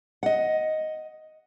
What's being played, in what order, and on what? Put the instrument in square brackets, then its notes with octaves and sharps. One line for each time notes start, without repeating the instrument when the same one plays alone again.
[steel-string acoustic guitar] D#5 F#5